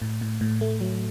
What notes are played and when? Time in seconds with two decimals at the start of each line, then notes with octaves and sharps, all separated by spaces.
0.02 A2
0.21 A2
0.41 A2
0.61 A3
0.81 F#3